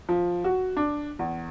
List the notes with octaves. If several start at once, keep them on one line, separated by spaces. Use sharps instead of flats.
F3
F#4
D4
E2